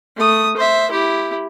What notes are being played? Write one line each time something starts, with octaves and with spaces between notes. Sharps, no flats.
A3 D#6
C5 E5
E4 G4